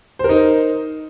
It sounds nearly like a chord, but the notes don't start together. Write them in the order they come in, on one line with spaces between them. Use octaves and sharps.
C5 A#4 D#4